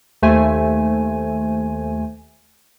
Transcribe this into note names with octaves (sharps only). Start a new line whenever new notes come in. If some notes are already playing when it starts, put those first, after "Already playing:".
D#2 A3 C5 G#5